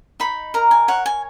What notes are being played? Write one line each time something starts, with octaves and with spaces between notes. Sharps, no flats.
D#4 B5
A#4 A#5
G#5
C#5 F#5
G#5